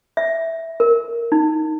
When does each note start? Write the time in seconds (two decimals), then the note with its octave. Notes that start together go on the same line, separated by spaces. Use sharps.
0.17 E5
0.80 A#4
1.32 D#4